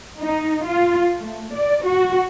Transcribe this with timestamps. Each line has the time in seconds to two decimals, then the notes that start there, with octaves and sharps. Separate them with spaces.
0.20 D#4
0.66 F4
1.17 A3
1.55 D5
1.85 F#4